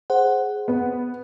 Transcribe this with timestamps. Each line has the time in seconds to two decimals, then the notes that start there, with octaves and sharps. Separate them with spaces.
0.10 G#4 C5 F#5
0.68 B3